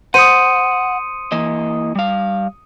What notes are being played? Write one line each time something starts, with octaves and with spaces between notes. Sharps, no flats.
C5 F#5 D#6 C#7 D#7
E3 A#3 D#5
G3 F5